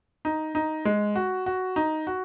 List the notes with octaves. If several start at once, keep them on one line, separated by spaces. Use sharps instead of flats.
D#4
D#4
G#3
F#4
F#4
D#4
F#4